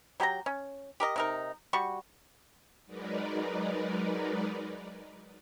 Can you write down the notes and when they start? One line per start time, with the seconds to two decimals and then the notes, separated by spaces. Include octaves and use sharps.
0.20 F#3 G4 G5 A#5
0.46 C#4
1.00 G4 A#4 D#5
1.16 C3 D#4 A#4
1.73 G3 F#4 C#6
2.86 F#3 G#3 D#4 A#4 B4 D5